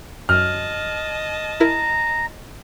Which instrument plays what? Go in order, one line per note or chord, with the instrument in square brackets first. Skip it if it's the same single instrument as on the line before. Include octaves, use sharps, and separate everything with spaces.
[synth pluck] F#2 [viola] D#5 A5 [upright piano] F6
[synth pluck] E4 A#4 [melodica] A#5